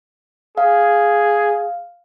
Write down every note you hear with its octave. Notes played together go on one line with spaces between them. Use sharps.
G#4 F5